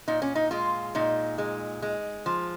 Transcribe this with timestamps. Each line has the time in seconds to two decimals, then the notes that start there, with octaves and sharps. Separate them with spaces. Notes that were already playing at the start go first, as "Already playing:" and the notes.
0.08 A#2 D#4
0.22 C#4
0.35 D#4
0.51 G#3 F4
0.95 A#2 D#4
1.38 G#3
1.82 G#3
2.26 F3